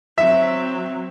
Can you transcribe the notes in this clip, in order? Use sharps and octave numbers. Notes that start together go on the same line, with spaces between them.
F#3 C4 E5